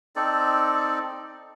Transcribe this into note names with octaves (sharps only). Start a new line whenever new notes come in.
C4 D#4 A4 D5